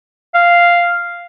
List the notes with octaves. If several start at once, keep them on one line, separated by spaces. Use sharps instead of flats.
F5